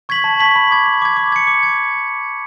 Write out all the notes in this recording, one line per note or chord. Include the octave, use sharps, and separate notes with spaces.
C#6 G#6 B6 F#7
A5
C#6 G#6 B6 F#7
B5
D6 G#6
B5
D6 G#6
D6
G#6 C#7
D6
G#6